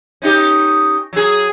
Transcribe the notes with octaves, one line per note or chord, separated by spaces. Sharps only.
C#4 D#4 G4
F#3 G#4